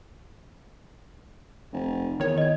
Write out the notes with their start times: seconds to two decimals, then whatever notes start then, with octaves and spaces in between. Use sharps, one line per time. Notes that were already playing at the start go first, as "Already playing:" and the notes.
1.73 F1
2.20 E2 D#3 C#5
2.38 D#5 G#6